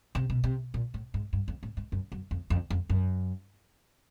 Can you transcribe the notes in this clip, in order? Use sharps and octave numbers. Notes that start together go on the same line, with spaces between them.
C3
B2
C3
A#2
A2
G#2
G2
F2
A2
G#2
F#2
F#2
F2
F2
F2
F#2